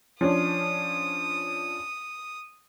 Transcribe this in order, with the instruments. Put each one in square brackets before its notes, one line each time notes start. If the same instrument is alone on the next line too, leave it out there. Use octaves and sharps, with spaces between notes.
[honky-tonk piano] F3 C#4 D4 [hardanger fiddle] D#6